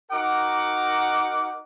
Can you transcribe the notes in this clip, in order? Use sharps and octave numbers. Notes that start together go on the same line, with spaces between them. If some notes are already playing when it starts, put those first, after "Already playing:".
D#4 F#4 A#4 F#5 D6